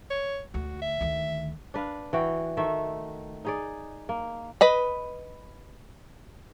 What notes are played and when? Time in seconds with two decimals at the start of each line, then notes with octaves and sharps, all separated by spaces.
0.10 C#5
0.54 D2 F#4
0.82 E5
1.01 D2 D#3
1.74 D4 B4 F5
2.13 E3 F#4 G5
2.57 D#3 A3 E5
3.45 D#4 G#4 D5
4.09 A#3
4.61 B4 D#5 B5